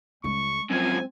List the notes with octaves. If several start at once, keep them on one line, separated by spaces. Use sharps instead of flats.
C#2 G3 G#3 C#6
F#2 F3 C4 G#5